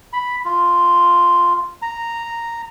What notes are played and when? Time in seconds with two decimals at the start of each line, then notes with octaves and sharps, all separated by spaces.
0.13 B5
0.45 F4
1.82 A#5